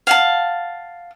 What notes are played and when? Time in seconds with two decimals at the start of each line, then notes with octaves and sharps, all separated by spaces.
0.07 F5 F#5 A5